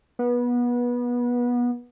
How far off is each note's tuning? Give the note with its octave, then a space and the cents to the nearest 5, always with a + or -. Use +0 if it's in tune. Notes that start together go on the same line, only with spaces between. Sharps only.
B3 -25